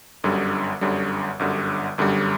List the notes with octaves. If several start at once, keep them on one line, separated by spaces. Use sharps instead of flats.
G1 F#2 D3 G3
G1 F#2 D3 G3
G1 F#2 D3 G3
G1 F#2 D3 G3